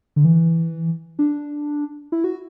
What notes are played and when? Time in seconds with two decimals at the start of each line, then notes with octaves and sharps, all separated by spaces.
0.16 D3
0.25 E3
1.19 D4
2.12 E4
2.24 F#4